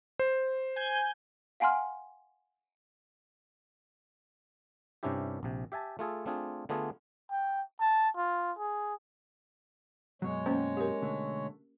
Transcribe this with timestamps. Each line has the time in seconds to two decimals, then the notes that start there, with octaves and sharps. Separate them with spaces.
0.19 C5
0.76 G#5 G6
1.60 F5 F#5 G#5 A#5 C6 F6
5.03 G2 C3 C#4 D4 E4 G4
5.43 A#1 C3
5.72 G4 E5 G#5 A5
5.99 A3 F4 G#4 A4
6.26 A3 C4 D4 F4 G#4
6.69 D3 A3 B3 D4 F4 G#4
7.31 G5
7.80 A5
8.17 F4
8.59 G#4
10.22 F#2 B2 F#3 G#3 C#5
10.46 A#3 C#4 C5
10.77 G4 A#4
11.02 B1 D3 A3